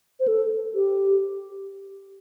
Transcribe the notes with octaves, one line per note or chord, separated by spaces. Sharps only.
C5
A4
G4